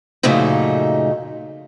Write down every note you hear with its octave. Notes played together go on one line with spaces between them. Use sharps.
F#2 A#2 C#3 F3 A3 D#4